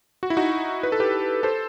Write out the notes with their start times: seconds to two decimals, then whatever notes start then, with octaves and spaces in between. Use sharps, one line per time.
0.23 F#4
0.30 E4
0.37 D#4 F#4
0.83 B4
0.92 A4
1.00 G4 B4
1.43 A4 C5